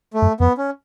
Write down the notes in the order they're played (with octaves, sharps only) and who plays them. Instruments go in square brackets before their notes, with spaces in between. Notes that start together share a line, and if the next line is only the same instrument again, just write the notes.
[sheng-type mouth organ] A3
[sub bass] F#2
[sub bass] F2 [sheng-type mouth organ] B3
[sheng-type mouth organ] C#4